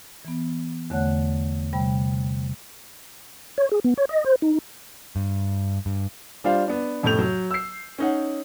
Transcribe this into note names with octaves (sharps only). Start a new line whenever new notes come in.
E3 B3
E2 D3 A3 C#5 F#5 F#6
C3 G3 G5 B5
C#5
G#4
B3
C#5
D#5
C5
D#4
G2
G2
G3 D4 F4 C5 F5
B3 D4
F2 A2 C3 A3 G6 F7
F#3
E6 C7
C#4 D#4 F#5